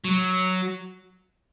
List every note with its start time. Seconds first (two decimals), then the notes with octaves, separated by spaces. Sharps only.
0.04 F#3